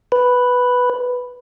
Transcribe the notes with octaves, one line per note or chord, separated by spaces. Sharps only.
B4